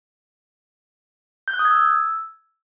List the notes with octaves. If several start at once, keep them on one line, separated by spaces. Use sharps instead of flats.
G6
F#6
D#6
G#6
E6